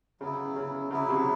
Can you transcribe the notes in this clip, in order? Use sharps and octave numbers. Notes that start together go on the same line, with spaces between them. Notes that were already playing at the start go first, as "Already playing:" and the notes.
C#3 F#3 B3 E4
C#3
C#3 F#3 B3 E4
C3